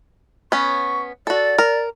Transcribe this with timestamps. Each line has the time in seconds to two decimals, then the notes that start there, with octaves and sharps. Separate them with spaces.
0.52 B3 C#4 C#6
1.27 F#4 A4 D5
1.58 A#4